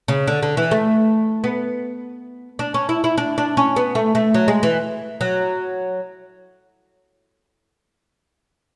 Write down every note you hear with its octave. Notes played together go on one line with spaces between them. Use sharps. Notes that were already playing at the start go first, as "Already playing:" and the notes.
C#3
D3
D3
E3
A3
B3
D4
C#4
E4
E4
D4
D4
C#4
B3
A3
A3
F#3
G#3
E3
F#3